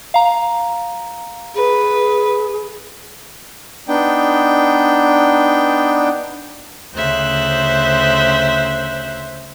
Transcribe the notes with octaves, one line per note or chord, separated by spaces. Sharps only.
F5 A#5
G#4 B4
B3 D4 D#4 G5
D2 C#3 C5 E5 F#6